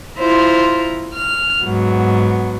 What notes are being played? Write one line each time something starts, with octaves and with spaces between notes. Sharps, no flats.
E4 F4 C5 A#5
F6
G#2 F#3 B3